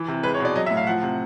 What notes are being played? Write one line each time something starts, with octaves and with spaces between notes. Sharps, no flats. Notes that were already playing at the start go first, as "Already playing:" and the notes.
Already playing: E3
C3
G#3 B4
C#5
B2
D5
F#3 D#5
E5
A2
F5
F3 F#5
C3